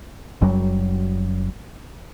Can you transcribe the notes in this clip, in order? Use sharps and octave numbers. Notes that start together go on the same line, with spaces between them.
F#1 F#2 F#3 G3